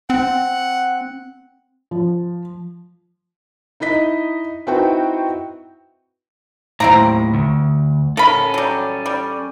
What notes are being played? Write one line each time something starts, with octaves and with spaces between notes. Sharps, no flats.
C4 F#5
F3
D#4 E4 D#5 B6
C4 D#4 E4 F#4 B4 G5
D#2 A2 C4 E4 A#5
D2
C#4 A4 A#4 B5
F#3 G3
G3